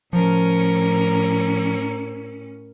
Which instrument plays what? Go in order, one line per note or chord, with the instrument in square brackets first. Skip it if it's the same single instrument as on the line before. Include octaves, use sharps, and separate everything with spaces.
[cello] A2 C#4 [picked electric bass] F3 [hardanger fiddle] A#4